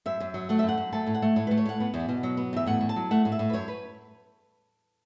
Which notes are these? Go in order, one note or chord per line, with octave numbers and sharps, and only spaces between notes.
F#2 E5
F#2
F#3
A3 F#5
F#2 E5
F#5
F#2
A3 A5
A2
F#5
A3
A2 C#5
A3 B4
C#5
A2 F#5
B3
E2
B2
F#3
B3
E2 E5
A2 F#5
A2
A5
F#3
A3 F#5
A2
E5
A2
B4
F#2 C#5
B4